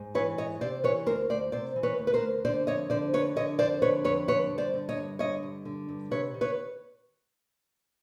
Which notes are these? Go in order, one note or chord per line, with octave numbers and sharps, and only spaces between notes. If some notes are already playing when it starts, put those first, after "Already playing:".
Already playing: G#2
E3 B4 C#5
G#2 C#5 D#5
C3 C5 D5
E3 B4 C#5
D2 A#4 C5
D2 C5 D5
C3 C5 D5
E3
B4 C#5
D2
B4
A#4 C5
D2
D3 C5 D5
F2 C#5 D#5
D3 C5 D5
F2 B4 C#5
D3 C#5 D#5
F2 C5 D5
D3 B4 C#5
F2 B4 C#5
D3 B4 C#5
G2
C5 D5
D3
C#5 D#5
G2
D3 C#5 D#5
G2
D3
G2
C3 B4 C#5
D#3
B4 C#5